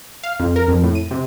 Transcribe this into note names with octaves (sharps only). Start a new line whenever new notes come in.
F5
F2
A#4
F2
A2
D#7
C3